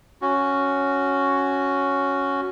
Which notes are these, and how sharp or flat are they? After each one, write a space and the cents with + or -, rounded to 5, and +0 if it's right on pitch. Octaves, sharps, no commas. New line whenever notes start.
C#4 +0 F#4 +0